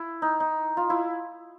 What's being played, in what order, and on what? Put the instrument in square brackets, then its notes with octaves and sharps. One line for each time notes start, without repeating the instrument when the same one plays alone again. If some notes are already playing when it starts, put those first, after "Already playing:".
Already playing: [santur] E4
D#4
D#4
F4
E4